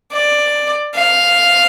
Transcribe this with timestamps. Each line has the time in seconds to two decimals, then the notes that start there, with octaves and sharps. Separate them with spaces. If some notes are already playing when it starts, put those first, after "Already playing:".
0.12 D5
0.95 F5